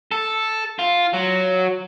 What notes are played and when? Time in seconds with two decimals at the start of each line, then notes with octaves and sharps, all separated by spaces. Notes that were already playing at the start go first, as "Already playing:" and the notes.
0.11 A4
0.79 F4
1.13 F#3